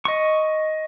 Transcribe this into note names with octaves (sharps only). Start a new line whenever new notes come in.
D#5 C#6